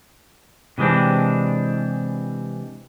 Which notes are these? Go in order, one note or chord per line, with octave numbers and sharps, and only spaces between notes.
C3 E3 G#3 C4 D4